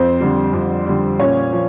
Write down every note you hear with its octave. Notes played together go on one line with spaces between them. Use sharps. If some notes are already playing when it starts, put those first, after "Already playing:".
Already playing: F2 C4 C5
D3 G3
F2
D3 G3
A#2 C#4 C#5
F3